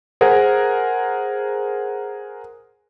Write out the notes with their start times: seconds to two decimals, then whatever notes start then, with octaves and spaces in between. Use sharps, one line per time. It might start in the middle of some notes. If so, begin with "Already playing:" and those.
0.21 G#4 A#4 C5 F#5